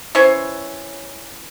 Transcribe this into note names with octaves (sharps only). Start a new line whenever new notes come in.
E3 C#4 C5 C#5